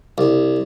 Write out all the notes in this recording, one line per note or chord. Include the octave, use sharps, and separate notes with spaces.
C2